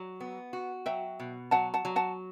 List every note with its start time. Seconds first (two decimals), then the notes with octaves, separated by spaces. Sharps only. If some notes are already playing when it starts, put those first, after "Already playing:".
Already playing: F#3
0.20 B3
0.53 F#4
0.86 F#3 E5 G5
1.20 B2
1.51 F#3 F#5 A5
1.74 F#5 A5
1.85 F#3
1.96 F#5 A5